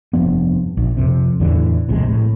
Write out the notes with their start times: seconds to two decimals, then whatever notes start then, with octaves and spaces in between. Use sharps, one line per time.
0.13 F1 G2 F3 B3
0.77 A#1
0.97 F2 C3
1.40 E2 A2 D3 E3
1.88 D1 A#1 C3 G#3
2.08 A2